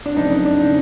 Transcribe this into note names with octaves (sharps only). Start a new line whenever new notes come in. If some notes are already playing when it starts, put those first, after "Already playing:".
D4
F#1 F2 C#3 D#4
D4
D4
C#3 D#4